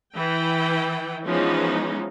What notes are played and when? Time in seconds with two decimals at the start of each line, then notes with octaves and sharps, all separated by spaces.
0.16 E3 E4 G5
1.27 E3 F3 G#3 B3 C#4 D#4